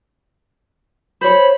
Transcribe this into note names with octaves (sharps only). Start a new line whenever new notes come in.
C5 C#5 B5